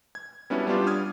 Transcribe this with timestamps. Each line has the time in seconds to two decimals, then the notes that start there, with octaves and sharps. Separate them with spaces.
0.15 G#6
0.50 G3 B3 C#4 D4 E4 F#4
0.67 G3 B3 D4 F4 G4
0.87 D#6 F6 G#6